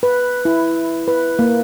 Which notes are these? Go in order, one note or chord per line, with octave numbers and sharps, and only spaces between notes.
B4
E4
B4
A#3